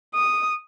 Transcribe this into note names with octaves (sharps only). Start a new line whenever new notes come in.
D#6